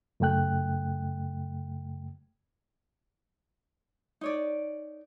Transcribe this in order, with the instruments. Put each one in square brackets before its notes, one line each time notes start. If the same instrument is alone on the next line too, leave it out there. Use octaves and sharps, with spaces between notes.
[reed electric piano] F#2 C#3 A3 G5 F#6
[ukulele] D#4 C#5 D5